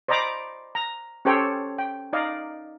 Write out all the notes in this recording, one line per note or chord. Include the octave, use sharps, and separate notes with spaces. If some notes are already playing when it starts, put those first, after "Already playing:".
C5 D5 D#5 A#5 B5 D6
A#5
C#4 G4 A4 C5 C#5 G5
G5
D#4 D5 D#5 F5